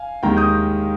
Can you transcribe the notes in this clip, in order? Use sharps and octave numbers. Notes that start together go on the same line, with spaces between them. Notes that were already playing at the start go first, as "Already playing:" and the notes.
Already playing: F5 G#5
D#2 D#3 G#3 G5 A#5
D#6 G6